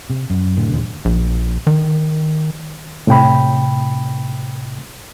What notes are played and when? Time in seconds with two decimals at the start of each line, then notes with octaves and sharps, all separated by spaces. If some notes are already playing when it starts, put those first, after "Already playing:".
0.10 C3
0.30 F#2
0.57 F1 A2 D3
0.70 F1 D#2 A#2 D3
1.05 A#1
1.67 D#3
3.07 A2 C3 G5 B5